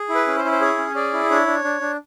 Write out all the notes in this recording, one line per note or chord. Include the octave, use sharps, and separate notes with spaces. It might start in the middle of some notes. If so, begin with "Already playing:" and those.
Already playing: G#4
E4
B4
C#4
C5
E4
C5
G#4 C#5
C#4
G#4 D5
E4
D4 C#5
D4
D4
D4